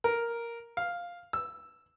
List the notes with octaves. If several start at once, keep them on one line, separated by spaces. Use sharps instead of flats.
A#4
F5
E6